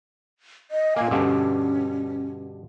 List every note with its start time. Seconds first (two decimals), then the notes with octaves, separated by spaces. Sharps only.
0.71 D#5
0.96 A#2 A#3 G#5
1.11 G2 B2 D3 C#4